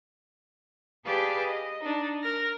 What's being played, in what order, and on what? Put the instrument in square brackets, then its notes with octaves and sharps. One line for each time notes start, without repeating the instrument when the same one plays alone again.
[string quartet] G4 G#4 B4 D5 F5 A5
D#5
D4 D#4
A#4 F6 A#6